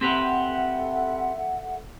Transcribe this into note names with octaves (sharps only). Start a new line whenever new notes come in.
C4 G4 A4 B4 E5 F#5